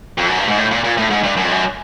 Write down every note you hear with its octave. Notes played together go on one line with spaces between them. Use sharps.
F2
F#2
G2
G#2
A2
A#2
A#2
A2
G#2
G2
F#2
F2
F#2